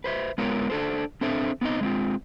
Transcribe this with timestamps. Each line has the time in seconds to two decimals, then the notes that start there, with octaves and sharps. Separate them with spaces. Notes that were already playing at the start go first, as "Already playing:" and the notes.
0.04 B4 C5 E5
0.38 G#3 B3 F4 A#4 C#5
0.70 D4 A4 C5
1.21 C4 D4 A4 C5 E5
1.61 B3 C4 D#4 D#5
1.81 G#3 C4 F4